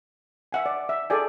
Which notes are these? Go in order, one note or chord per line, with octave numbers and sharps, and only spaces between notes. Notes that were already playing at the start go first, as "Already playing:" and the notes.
E5 F#5 G#5
D5
E5
G#4 A4 D5 G5 G#5